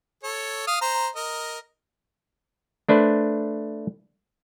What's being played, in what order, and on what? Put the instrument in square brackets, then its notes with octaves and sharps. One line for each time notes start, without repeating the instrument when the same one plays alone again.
[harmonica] A4 C#5
F5 D#6
C5 A#5
A#4 D#5
[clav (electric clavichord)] A3 D4 B4 C5